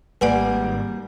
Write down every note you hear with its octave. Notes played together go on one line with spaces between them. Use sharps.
G#1 G3 A#3 B4 D5 F#5 G#5